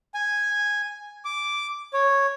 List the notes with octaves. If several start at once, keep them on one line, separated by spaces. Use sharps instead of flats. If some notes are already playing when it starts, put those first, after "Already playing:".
G#5
D6
C#5